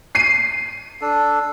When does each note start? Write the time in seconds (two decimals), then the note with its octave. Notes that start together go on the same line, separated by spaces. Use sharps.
0.15 B6 C7 D#7
1.01 D4 A4